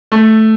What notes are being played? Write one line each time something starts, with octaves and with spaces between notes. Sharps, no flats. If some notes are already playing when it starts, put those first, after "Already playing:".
A3